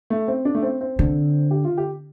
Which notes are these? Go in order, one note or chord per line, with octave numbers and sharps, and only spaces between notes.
A3
C4
D4
A3
C4
C4
D3
G4
F4
G4